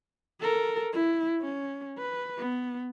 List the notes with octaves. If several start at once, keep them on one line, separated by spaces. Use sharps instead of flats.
A4 A#4
E4
C#4
B4
B3